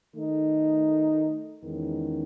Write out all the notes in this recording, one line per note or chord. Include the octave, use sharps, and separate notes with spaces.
D#3 A3 D#4
E2 D#3 G#3 C#4